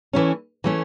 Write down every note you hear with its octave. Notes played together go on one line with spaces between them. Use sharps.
E3 A3 C#4
E3 A3 C#4